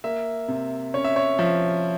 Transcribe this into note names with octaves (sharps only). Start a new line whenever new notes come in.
A#3 E5
C3
C#4 C#5
E5
C#5
F3 E5